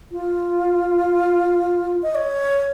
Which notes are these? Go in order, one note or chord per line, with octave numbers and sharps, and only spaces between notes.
F4
D#5
C#5